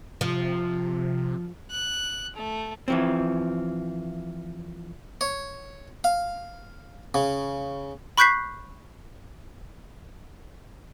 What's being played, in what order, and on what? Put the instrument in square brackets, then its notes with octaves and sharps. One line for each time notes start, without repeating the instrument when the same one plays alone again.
[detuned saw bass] C3 [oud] F3
[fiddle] F#6
A3
[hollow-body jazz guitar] E3 F3 C4
[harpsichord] C#5
F5
C#3
[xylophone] B5 C#6 F#6 G6 B6 C7